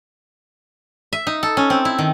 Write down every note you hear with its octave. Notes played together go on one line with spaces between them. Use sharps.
E5
D#4
A4
C#4
C4
E4
D#3